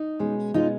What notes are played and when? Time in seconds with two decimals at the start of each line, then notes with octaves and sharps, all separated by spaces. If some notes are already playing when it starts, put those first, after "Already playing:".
Already playing: D#4
0.19 B2 G#3 C#4
0.54 B2 G#3 C#4 D#4 F4